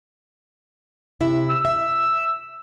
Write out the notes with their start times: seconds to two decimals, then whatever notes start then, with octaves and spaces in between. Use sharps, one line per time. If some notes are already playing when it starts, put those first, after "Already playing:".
1.21 C3 E4 E5
1.50 E6
1.65 E5